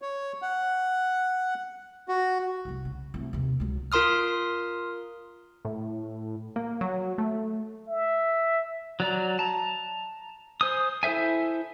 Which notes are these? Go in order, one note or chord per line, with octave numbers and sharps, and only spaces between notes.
C#5
F#5
F#4
C2 F2
C#3
C2 A3
D#2 C3
C#2 F#3
F4 A#4 C6 D#6 F6
A2
A#3
F#3
A3
E5
F#3 D5 A#5
A5 A#5
C5 G#5 D#6
E4 A4 C5 E5 G#5